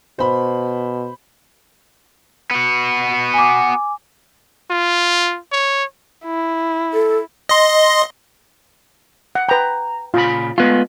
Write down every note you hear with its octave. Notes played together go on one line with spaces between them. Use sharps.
B2 C5 B5
B3 F#4
G#5 D6
F4
C#5
E4
A4
D#5 C6
F#5
B4 G5 A#5
A#2 C#3 F4 B5
G#3 A3 B3 F4